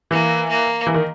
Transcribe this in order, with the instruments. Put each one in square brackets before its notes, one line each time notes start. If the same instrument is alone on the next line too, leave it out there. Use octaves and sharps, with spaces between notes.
[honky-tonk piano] E3 [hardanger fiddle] A#3
[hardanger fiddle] A#3
[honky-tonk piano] E3
D#3